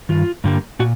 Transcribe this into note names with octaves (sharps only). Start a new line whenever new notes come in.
G2 D#3 F4
G2 D3 G3 A#3
A#2 F#4